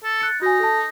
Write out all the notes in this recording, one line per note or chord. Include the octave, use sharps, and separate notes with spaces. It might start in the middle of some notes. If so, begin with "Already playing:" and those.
A4
F#6 A6 C#7
D#4 F#4 G#5
A4 A5